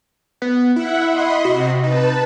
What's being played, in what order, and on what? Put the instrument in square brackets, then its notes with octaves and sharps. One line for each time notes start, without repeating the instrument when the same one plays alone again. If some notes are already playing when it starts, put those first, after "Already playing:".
[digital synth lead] B3
[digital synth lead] E4 [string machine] E5 F#5
[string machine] D#5 B5 C6
[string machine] C3 [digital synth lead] F#4
[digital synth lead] D#4 [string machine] B4 A5